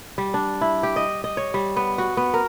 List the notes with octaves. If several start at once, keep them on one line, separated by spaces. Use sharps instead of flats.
G3
D4
E4
G4
D#5
D#5
C#5
G3
B3
F#4
B3
A#4